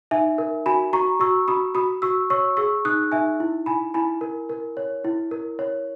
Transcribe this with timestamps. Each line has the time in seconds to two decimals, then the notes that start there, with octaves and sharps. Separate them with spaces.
0.11 D#4 E5 G#5
0.38 A#4
0.66 F#4 G#5 B5
0.93 F#4 A#5 C#6
1.20 F#4 C#6 E6
1.48 F#4 B5 D#6
1.75 F#4 B5 D#6
2.02 F#4 C#6 E6
2.30 C#5 C#6 E6
2.57 G#4 C#6 E6
2.85 D#4 D#6 F#6
3.12 D#4 E5 G#5
3.40 E4
3.66 E4 G#5 B5
3.94 E4 G#5 B5
4.21 A#4
4.49 A#4
4.77 C#5
5.04 E4
5.31 A#4
5.59 C#5